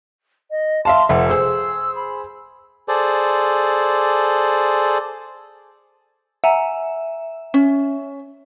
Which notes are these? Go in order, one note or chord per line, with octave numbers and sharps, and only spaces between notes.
D#5
E5 F5 A5 C6
F1 E5 F#5
G#4 C5 E6
B5
G#4 A4 C5 D5
E5 F#5 G#5 A#5
C#4